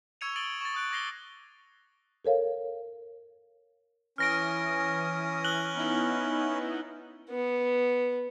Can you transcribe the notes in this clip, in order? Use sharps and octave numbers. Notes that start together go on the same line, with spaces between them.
C#6 E6 G#6 C#7 D#7 F7
D#6 A6 D7 D#7 F#7 G7
C#6 A6
D#6 F#6 D7
D6 G#6 A#6 C7 G7
A4 A#4 C#5 F5
E3 C#4 D#6 F6 A#6 D7
F#6 F#7 G7
B3 D#4 E4
B3